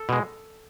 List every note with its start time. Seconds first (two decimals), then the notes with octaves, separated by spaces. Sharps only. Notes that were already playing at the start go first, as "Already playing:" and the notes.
Already playing: A4
0.09 B2 G#3